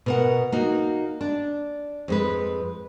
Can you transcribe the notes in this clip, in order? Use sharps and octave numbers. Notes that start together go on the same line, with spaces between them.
B2 A#4 F#5
A#3 D#4 F#4
D4
F2 G#3 B4